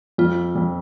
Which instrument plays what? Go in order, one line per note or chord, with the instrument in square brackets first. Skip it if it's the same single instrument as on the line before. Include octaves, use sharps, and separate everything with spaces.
[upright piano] F2 [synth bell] F4
[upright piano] F2